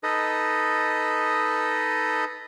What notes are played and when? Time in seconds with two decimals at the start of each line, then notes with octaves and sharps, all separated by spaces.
0.03 D#4 A4 B4 D#5